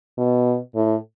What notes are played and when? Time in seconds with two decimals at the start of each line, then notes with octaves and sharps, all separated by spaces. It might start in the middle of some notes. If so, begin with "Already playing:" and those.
0.17 B2
0.75 A2